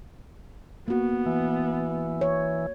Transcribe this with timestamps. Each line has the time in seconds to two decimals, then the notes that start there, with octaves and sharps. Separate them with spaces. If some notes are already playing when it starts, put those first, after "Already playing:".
0.88 A#3 B3 F#4
1.26 E3
2.21 C#5